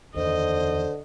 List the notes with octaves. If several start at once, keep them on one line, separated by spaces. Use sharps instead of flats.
E2 D3 D#3 C5 D#5